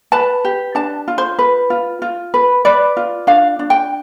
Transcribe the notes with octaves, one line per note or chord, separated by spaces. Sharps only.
B4 A5
G4
D4 A5
F4
C5
B4
F4
F4
B4
B4 D5
F4
D4 F5
D4
G5